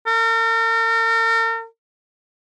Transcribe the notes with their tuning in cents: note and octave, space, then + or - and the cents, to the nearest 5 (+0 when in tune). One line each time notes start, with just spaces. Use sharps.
A#4 -40